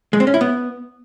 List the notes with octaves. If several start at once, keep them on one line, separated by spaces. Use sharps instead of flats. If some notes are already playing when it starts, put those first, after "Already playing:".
G#3
C4
C#4
E4
B3